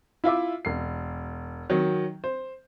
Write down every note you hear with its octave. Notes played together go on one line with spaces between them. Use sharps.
E4 F4 E5 D6
E1 C7
D#3 F#3
C5